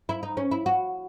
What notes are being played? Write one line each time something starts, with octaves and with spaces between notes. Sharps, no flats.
E4
D#4
C#4
E4
F#4